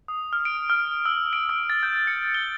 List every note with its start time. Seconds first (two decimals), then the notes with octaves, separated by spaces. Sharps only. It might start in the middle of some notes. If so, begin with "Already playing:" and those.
0.08 D#6
0.33 F6
0.45 D7
0.70 F6
1.05 E6
1.33 D7
1.49 E6
1.70 A6
1.83 G6
2.07 C#7
2.34 G7